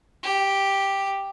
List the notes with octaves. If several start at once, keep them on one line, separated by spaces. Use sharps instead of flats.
G4